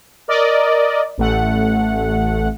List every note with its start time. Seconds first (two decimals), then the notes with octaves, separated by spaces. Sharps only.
0.28 A#4 D5 D#5
1.18 A1 A3 F#5